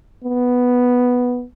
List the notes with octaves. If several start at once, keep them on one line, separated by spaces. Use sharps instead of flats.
B3